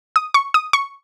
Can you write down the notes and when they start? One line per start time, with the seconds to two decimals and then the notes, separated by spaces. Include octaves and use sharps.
0.16 D#6
0.34 C#6
0.54 D#6
0.73 C#6